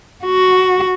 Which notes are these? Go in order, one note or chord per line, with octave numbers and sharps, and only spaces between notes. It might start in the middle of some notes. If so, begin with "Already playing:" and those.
F#4